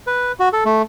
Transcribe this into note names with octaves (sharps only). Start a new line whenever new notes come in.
B4
F#4
A4
A3